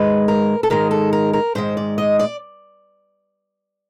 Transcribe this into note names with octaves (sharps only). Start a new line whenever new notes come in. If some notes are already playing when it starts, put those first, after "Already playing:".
Already playing: G#2 D#3 G#3 B4
A#4
A4
G#2 D#3 G#3 A#4
A4
A#4
A#4
G#2 D#3 G#3 C5
D5
D#5
D5